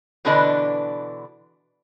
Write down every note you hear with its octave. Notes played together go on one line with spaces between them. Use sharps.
B2 D3 E3 D4 B4 D#5